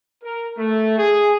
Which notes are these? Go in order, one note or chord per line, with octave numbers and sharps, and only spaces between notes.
A#4
A3
G#4